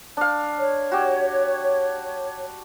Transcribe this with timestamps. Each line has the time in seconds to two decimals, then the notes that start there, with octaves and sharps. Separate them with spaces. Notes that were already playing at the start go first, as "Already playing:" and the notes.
0.17 D4 F5
0.58 C#5
0.92 F#4 G4